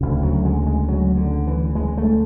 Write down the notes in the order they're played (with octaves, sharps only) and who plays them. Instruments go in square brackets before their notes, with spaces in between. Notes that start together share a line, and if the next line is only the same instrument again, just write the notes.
[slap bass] D2 C#3
F#3
G#3
G#3
F#3
D3
E3
G#3
A3